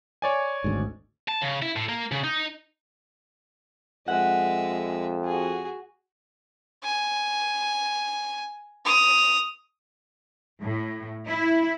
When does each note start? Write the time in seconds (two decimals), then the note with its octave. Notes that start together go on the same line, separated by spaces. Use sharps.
0.22 C#5 D5 G#5
0.64 G#1 D2 G#2
1.28 A5
1.41 C#3
1.62 E4
1.76 A2
1.89 A#3
2.12 C#3
2.24 D#4
4.08 F2 G#3 E5 F#5
5.25 F#4 G#4
6.84 G#5
8.85 D#6 F7
10.62 A2
11.28 E4